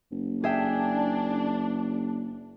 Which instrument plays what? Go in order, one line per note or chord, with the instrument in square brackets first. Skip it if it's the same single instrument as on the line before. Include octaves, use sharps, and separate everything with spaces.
[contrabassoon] F#1
[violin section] D4 [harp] G#4 E5 G5